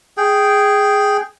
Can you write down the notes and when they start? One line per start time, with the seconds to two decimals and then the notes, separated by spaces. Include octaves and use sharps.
0.17 G#4 G5